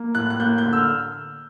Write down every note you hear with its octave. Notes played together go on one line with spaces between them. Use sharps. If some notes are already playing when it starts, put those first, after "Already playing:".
Already playing: A#3
A2 F#6
F#6
A#3 G6
G6
D3
E6
F6